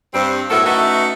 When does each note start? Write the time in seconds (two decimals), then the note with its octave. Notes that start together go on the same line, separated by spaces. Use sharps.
0.14 G2 C4
0.50 A2 F#3 B3 A4 A#4 E5
0.66 A3 C#4 D#4 F#4 B4 E5